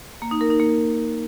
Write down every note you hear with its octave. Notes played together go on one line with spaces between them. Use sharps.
A#3
D#4
A#4
D#4
A#3